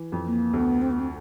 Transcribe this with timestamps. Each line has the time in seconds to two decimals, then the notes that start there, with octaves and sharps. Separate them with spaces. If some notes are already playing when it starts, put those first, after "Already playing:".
Already playing: E3
0.12 F2
0.26 A#3
0.53 D2 B3
0.82 C4
0.91 B3
1.00 C4